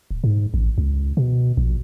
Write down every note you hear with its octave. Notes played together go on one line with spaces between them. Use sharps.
D1
G#2
A1
C#2
B2
A#1